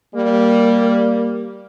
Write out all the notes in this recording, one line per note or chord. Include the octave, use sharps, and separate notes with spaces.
G3 A#3